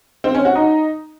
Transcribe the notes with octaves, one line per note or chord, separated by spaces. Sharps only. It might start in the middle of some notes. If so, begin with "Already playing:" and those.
C4
C#4
F#4
D#4